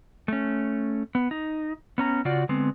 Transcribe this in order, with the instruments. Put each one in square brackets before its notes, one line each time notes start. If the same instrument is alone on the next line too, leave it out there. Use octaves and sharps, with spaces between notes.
[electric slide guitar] A3 C#4
B3
D#4
B3 C#4 A#5
C#3 F4 F#4 D5
D3 G#3 B3 C4